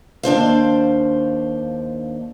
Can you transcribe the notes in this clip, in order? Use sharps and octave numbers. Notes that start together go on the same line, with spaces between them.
D#2 D4 C5 F5